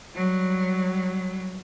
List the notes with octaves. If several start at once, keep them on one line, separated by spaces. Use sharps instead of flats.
F#3 G3